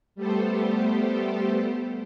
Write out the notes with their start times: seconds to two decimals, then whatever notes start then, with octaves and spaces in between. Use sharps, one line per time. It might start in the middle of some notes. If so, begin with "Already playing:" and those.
0.15 G3 A3 B3 G4 A4 C5